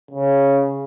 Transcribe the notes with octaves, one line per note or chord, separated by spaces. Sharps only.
C#3